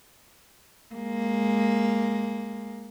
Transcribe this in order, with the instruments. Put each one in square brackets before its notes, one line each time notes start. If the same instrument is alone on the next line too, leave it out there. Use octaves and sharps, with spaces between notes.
[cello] G#3 A#3